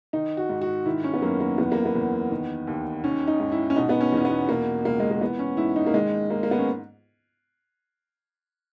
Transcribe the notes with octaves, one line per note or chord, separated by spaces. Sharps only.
D#3 D#4
F#4
G#2
F#4
D#3 E4
C#4
B3
F#2 A#3
A#3
E2 B3
A#3
B3
E2
D#3
D#2
D#3 C#4
D#4
G#2
E4
C#4
B2 D#4
B3
C#4
E2 C#4
B3
B2 A#3
C#2 A#3
G#3
A#3
E3 B3
C#4
G#2 E4
D#4
A#3
D#3 G#3
G#2 A#3
A#3
B3
C#4